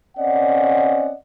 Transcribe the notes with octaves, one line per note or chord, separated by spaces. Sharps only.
C4 C#4 D5 D#5 F#5